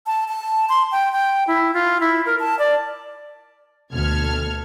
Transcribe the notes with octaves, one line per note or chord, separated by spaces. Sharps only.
A5
A5
C6
G5
G5
E4
F4
E4
A#4
A5
D5
D2 B2 A4 F6 G#6